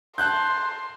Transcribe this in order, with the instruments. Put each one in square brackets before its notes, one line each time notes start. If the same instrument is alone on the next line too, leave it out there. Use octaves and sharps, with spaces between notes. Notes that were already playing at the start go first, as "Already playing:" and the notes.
[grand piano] A5 F#6 G6 [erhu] C6